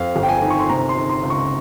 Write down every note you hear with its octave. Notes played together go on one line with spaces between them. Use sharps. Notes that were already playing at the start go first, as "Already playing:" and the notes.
Already playing: F2 F5
G1
G5
G#5
D#3
C#6
C6
C3 A#5
C6
D#3
C6
C#2
C#6